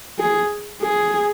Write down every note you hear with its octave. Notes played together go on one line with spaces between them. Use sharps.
G#4
G#4